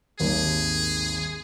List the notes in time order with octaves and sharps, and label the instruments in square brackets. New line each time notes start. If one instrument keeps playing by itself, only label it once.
[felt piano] G#1 D#2 G3 [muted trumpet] G#4